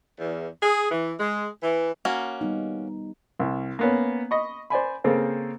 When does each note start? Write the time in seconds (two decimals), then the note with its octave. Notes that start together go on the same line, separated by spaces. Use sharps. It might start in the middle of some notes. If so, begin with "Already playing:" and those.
0.18 E2
0.63 G#4
0.90 E3
1.19 G#3
1.63 E3
2.05 A#3 C#4 F#4
2.41 G3 B3 D#4
3.39 C2
3.79 A#3 B3 C#4
4.31 D#5 B5 C#6
4.70 C5 D5 G#5 B5
5.04 C#3 A#3 C4 A4 C5